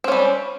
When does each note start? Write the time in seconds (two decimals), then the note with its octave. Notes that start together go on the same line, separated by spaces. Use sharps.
0.04 C4
0.08 C#4
0.12 G3